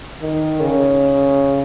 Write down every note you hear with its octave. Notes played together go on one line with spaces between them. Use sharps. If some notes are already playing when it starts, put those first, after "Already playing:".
D#3
C#3